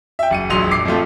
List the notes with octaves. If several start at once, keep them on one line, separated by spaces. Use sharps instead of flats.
E5 G5
F#1 C#7 D#7
E1 A#1 F#3 C6 F7
D6 C7
F2 F3 A3 F4